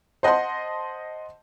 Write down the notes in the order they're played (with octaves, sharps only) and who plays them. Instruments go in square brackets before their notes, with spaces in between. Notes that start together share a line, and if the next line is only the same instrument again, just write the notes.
[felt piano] C5 D#5 F#5 A5 C6